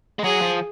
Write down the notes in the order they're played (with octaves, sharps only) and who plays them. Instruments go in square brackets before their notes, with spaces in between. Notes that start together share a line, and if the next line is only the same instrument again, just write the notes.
[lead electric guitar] G#3
[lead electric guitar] F#3 [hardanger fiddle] G#4
[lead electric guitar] F3